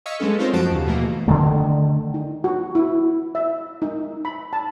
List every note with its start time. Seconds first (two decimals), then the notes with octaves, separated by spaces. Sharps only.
0.06 D#5 F5 C#6 E6 G#6 B6
0.20 G#3 A3 B3 C#4 A4
0.39 C4 D#4 F4 A#4 C5 C#5
0.53 F#2 F3 F#4 A5 C7 D7
0.72 D#2 C#3
0.86 B2 E3 A3 A#3
1.28 D3 D#3 A3
2.14 D#4
2.44 F#4
2.75 E4
3.35 E5
3.82 D#4
4.25 B5
4.53 A5